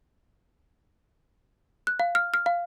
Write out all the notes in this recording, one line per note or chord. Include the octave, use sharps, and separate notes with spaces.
F#6
F5
F6
F6
F5